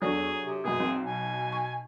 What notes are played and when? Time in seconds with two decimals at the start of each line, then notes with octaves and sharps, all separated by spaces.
0.02 E2 F#3 D4 G#4 A4 D5 C#6
0.42 C3
0.64 F#2 B2 G#4
0.80 B1 C4
1.06 B2 G#5
1.53 C#6